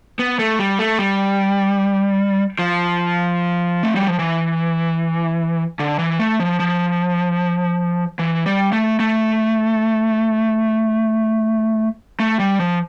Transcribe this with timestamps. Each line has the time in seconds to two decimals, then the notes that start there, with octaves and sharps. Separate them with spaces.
0.19 B3
0.39 A3
0.59 G3
0.79 A3
0.99 G3
2.59 F3
3.83 A3
3.96 G3
4.07 F3
4.19 E3
5.79 D3
5.99 E3
6.19 A3
6.40 F3
6.59 F3
8.19 E3
8.46 G3
8.72 A3
8.99 A3
12.20 A3
12.39 G3
12.59 F3